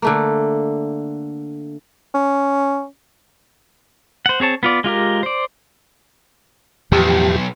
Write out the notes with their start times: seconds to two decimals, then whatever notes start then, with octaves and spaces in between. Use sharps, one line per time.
0.02 D3 A3 A#3
2.15 C#4
4.26 C5 F#5
4.40 C4 G#4 C#5 A5
4.63 B3 F4 D5
4.84 G#3 F4 G4 A#4
5.23 C5 D5
6.92 B1 E2 A2 F3 G4